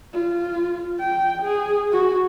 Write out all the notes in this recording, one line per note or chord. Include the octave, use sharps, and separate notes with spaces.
F4
G5
G#4
F#4